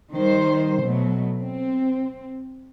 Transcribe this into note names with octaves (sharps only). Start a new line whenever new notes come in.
D#3 G3 C5
B2 F#3 A3
C4